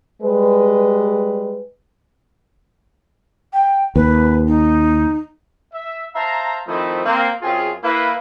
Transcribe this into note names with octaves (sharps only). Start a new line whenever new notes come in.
G3 G#3 B4
G5
D#2 B4
D#4
E5
C5 E5 F5 A5 A#5
D#3 F3 A3 C4 D#4 E4
A#3 C4
F#2 C4 F4 G#4
A#3 E4 B4